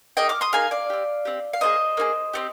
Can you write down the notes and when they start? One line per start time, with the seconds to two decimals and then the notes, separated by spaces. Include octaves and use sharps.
0.17 A#3 D#4 G#4 D#5 G5
0.29 D6 F6
0.41 C6 D#6
0.53 A#3 D#4 G#4 F5 G#5
0.71 D5 F5
0.90 C4 G4
1.25 C4 G4
1.53 F5
1.61 A#3 F4 G#4 C5 D#5
1.97 A#3 F4 G#4
2.33 C4 D#4 G4